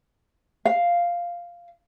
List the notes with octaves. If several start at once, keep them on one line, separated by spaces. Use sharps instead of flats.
F5